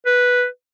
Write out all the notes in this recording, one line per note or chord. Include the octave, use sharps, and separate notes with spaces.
B4